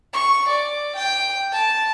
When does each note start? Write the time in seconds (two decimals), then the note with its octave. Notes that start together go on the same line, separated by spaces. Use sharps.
0.13 C#6
0.48 D5
0.96 G5
1.52 A5